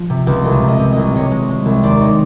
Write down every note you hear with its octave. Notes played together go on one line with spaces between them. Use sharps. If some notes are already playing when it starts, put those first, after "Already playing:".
Already playing: F3
C3
C#2
C2 D#5
C3
D#5
C3
C2 D#5
C3 C#5 D#5
G#3
G#3
C2
D#2 C5 D5
C#5 D#5